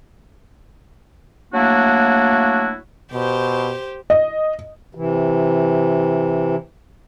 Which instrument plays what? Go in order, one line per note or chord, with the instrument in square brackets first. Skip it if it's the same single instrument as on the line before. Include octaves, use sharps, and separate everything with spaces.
[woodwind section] F#3 A3 A#3 D4 E4 F#4
[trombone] B2 [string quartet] G4 C5
[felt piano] D#5
[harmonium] C3 E3